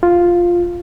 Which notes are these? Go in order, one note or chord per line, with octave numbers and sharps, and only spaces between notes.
F4